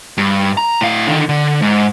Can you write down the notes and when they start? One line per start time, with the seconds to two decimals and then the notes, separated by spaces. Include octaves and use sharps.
0.18 G2
0.57 A#5
0.81 A2 F5
1.07 D3 D#3
1.29 D3
1.62 G#2